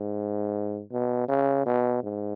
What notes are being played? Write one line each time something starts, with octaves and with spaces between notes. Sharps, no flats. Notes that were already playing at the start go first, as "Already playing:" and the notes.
Already playing: G#2
B2
C#3
B2
G#2